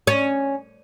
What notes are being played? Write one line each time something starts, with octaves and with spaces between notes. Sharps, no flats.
C#4